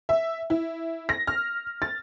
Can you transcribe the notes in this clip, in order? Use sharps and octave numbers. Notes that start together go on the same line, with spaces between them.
E5
E4
A#6
F6
A6